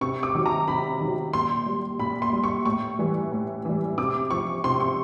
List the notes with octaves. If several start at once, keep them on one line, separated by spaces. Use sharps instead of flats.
C3 C#6
D6
D#3 F#3
A#5
C3 B5
D#3 F#3
A#2 C6
G3
A#2 B5
C6
G3
C#6
A2 C#6
E3 G3
A2
E3 G3
C3 D6
F3 C#6
C3 C6
C#6